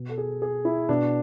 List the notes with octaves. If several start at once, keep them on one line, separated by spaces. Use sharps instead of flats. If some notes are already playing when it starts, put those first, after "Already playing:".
Already playing: B2
A4
G#4
G#4
E4
B2 D4